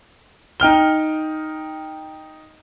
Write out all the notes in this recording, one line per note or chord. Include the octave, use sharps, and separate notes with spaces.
D#4 G5 F6 G7